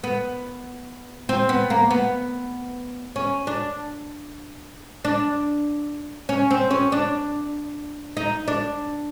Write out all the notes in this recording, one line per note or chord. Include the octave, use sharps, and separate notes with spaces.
B3
C4
B3
A#3
B3
C#4
D4
D4
C#4
C4
C#4
D4
D#4
D4